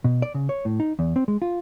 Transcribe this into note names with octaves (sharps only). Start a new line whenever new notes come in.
B2
D5
C#3
C#5
A2
D#4
E2
C4
G#3
F4